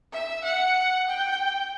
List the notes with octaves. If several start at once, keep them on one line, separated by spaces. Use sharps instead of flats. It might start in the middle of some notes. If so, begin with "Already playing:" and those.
E5
F#5
G5